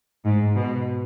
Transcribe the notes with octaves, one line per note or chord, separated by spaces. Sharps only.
G#2
B2